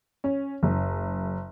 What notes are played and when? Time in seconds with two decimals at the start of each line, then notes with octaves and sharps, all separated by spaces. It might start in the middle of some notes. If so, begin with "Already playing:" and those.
0.24 C#4
0.63 F#1